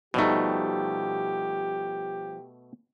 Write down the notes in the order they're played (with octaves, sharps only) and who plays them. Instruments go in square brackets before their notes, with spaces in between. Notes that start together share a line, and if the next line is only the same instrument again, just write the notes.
[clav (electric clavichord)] B2 A3 [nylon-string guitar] F3 G3 D#4 [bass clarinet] G4